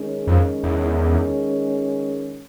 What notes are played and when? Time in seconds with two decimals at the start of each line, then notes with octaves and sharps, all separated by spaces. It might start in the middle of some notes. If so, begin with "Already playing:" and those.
Already playing: D#3 G#3 C#4
0.27 F2
0.64 E2